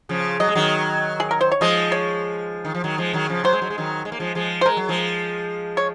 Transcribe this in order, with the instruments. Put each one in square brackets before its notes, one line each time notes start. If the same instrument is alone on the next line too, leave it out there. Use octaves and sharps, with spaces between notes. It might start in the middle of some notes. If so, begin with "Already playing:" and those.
[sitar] C#3 F3
[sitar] F#3 [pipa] D#5
[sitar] G#3
D#3 F#3
[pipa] G#4
A#4
C5
C#5
[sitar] F3 G#3 [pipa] D#5
[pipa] C#5
[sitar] D#3
F3
D#3 F#3
F3 G#3
D#3 F#3
C#3 F3
[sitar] F#3 [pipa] C5
[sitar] G#3
F#3
G#3
D#3 F#3
G#3
A#3
F3 G#3
F3 G#3
[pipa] C5
[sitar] G#3 [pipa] A#4
[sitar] F#3
F3 G#3
[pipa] C#5